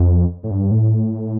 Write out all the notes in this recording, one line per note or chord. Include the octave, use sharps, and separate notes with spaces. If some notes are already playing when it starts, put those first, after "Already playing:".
Already playing: F2
A2
G2
A2